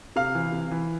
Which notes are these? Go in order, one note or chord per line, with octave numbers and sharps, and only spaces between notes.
C3 F5
E3
C3
E3